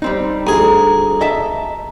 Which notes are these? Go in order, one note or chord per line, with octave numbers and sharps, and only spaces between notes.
G3 C4 D#4
D2 G#4 A#5
D#5 E5 A5